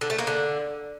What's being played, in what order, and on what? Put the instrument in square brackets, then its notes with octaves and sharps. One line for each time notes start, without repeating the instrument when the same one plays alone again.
[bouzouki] D3
A3
A#3
D3